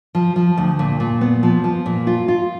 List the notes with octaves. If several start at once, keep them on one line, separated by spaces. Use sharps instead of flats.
F3
F3
D2
A#2
A#2
B3
F3
F3
A#2
F4
F4